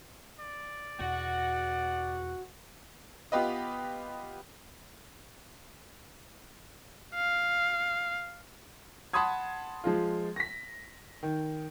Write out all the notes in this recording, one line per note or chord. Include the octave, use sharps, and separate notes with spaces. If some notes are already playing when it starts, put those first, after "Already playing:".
D5
E2 B2 F#4 F#5
B3 F4 G4 B4 D#5
F5
F#5 A5 B5 C6 D#6 G#6
F3 G#3 F4
A#6 B6
D#3